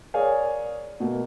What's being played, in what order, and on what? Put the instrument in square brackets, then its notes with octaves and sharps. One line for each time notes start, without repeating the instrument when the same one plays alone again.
[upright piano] G#4 A#4 C#5 D5 F5 G#5
B2 A3 A#3